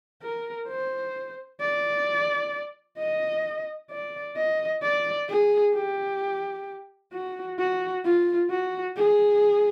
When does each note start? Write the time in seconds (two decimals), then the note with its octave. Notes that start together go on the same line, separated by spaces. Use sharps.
0.22 A#4
0.69 C5
1.61 D5
2.99 D#5
3.90 D5
4.37 D#5
4.83 D5
5.29 G#4
5.74 G4
7.13 F#4
7.59 F#4
8.05 F4
8.50 F#4
8.97 G#4